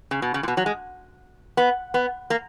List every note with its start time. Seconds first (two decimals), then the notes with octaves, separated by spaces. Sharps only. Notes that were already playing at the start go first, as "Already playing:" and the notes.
0.11 C#3
0.22 B2
0.34 C#3
0.43 A#2
0.48 B2
0.57 F#3
0.66 G#3
1.57 B3
1.94 B3
2.30 A#3